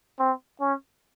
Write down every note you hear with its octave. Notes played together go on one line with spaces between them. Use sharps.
C4
C#4